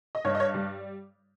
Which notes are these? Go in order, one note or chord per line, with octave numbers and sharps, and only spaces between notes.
D#5
G2 C#5
D#5
C#5
G3